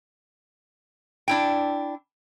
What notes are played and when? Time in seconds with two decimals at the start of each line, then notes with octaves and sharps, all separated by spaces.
1.28 D4 E4 G5